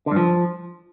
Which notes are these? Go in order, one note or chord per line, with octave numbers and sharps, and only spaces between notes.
D3
G2
F3